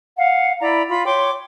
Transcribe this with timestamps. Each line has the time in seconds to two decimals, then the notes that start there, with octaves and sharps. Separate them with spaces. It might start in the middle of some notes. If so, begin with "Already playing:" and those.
0.18 F5 F#5
0.60 E4 D5 A#5 B5
0.88 F4 B5
1.05 C#5 G5 C6 D6